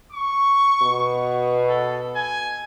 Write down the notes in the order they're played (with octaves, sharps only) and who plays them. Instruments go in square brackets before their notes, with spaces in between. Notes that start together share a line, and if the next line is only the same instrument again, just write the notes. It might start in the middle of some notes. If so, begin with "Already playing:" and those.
[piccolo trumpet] C#6
[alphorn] B2
[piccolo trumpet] A4
G#5